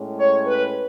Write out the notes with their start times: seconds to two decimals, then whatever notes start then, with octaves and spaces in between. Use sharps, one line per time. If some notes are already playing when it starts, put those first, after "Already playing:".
Already playing: A2 G#3 C#4
0.18 C#5
0.46 B4